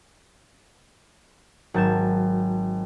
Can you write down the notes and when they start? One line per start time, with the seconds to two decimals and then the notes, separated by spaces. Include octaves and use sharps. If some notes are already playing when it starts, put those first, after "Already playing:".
1.74 G#1 F#3 A5 G6 G#6 E7